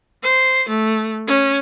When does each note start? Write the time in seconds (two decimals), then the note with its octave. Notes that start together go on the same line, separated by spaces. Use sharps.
0.23 C5
0.68 A3
1.27 C#4